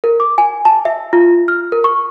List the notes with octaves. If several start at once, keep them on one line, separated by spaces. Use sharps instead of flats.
A#4
D6
G#5
A5
E5
F4
F6
A#4
C#6